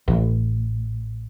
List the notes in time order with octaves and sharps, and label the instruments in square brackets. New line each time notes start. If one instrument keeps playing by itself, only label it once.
[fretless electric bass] A1